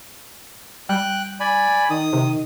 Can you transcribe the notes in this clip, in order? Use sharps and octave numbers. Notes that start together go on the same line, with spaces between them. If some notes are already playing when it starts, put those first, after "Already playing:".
G3 G5 F#6
D5 G#5 B5
D#3 D#6
C3 D#3